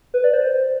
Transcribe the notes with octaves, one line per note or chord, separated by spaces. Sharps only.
B4
D5
C5
C5